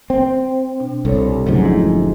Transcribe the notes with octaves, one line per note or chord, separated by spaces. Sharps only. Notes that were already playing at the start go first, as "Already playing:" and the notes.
C4
B2 D4
C2 A4 C#5
F1 D2 G#2 F#3 G#3 C#4
F3 G#3 E4